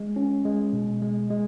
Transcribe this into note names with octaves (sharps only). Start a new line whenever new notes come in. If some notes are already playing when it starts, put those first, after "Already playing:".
Already playing: G#3
C#4
G#3
B2
G#3
G#3